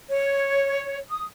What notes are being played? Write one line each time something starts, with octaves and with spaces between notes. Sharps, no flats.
C#5
D#6